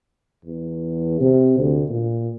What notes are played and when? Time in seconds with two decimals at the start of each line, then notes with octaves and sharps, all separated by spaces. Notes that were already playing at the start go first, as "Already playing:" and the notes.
0.45 E2
1.21 C3
1.59 D2
1.90 A#2